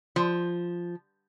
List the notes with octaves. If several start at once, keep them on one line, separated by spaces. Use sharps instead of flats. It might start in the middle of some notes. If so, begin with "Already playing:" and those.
F3